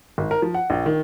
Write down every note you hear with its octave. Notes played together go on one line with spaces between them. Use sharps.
G#1
A#4
F3
F#5
A#1
D#3